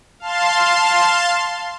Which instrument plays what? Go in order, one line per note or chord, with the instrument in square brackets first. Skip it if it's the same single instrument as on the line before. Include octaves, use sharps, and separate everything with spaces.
[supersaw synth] F5 A5 C6